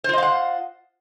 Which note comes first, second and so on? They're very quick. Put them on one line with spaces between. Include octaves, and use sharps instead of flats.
C5 F4 D#5 F5 F#5